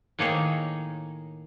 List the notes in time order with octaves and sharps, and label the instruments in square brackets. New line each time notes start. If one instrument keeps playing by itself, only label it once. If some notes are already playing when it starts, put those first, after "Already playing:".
[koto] A2 D#3 A#3 D#4 G#4 C#5